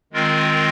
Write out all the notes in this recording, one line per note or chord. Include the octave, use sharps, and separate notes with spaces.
D#3 G#3 C4 F4 A#4